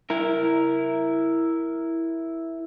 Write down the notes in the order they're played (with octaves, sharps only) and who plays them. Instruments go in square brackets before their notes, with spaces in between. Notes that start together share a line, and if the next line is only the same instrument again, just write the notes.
[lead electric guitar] E4 A#4